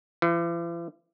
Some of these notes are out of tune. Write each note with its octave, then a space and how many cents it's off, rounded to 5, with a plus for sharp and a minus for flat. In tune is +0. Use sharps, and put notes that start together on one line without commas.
E3 +45